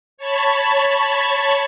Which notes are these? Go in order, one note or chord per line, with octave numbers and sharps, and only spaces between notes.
C#5 A5 B5 C#6